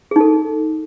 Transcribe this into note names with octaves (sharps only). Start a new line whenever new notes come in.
D#4 G#4 A4